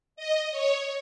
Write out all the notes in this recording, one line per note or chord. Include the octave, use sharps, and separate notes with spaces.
D#5
C#5